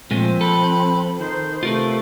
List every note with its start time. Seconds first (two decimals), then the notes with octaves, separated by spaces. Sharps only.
0.11 A#2 F3 G#3 A3 C4
0.41 A4 B5
1.18 D#3 C5
1.63 C3 A3 F4 A#4 B4